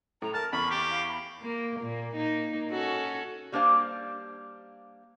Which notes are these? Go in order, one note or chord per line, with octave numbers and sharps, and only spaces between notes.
A2 A#5
A#4 A5 F6
E2 B5 C#6
G4
F5
B5
A#3
A#2 A#3
A#3 D#4
C#4 F#4 A4
G3 A#3 D4 C5 F5